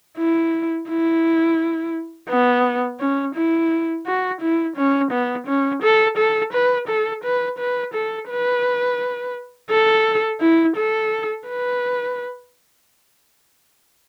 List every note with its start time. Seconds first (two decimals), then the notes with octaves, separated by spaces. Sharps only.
0.18 E4
0.89 E4
2.29 B3
3.00 C#4
3.36 E4
4.07 F#4
4.41 E4
4.77 C#4
5.12 B3
5.48 C#4
5.83 A4
6.18 A4
6.53 B4
6.88 A4
7.24 B4
7.59 B4
7.94 A4
8.29 B4
9.71 A4
10.41 E4
10.77 A4
11.48 B4